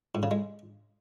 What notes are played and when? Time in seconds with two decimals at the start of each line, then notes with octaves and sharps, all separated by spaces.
0.15 G#2
0.23 C#3
0.31 G#3